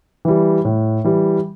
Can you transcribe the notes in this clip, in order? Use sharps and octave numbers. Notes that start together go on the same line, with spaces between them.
E3 G3
A2
E3 G3